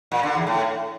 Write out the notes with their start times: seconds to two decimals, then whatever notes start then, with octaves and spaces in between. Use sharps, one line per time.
0.12 A#2
0.23 D3
0.35 E2
0.47 A2